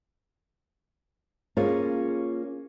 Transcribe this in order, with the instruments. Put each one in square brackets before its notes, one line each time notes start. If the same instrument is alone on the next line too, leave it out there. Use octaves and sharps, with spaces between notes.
[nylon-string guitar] A#3 C#4 F4 G#4 C#5